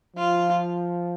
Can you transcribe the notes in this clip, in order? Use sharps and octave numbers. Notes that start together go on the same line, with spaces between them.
F3 F4